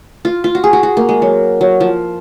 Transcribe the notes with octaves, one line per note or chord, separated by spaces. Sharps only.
F4
F4
F#4
G#4
F#4
F#4
A#3
G#3
F#3
F#3
F3